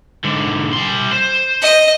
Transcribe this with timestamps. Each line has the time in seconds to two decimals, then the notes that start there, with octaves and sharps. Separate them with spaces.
0.24 G#2 D3
0.73 G3 C6
1.12 C5
1.62 D#5